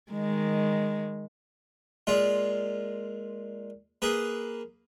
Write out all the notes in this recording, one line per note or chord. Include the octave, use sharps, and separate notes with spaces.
D#3 G#3
A#2 G#3 F4
A#3 G#4 B4